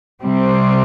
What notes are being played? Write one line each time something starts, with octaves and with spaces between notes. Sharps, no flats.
C3 G3 C4